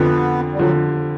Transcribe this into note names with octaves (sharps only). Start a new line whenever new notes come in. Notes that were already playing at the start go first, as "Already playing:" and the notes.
Already playing: F2 D3 F3 B3
G3
D3 F3 F#3